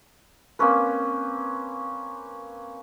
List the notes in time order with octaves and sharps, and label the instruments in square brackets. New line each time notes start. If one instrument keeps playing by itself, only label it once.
[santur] A#3 C4 C#4 B4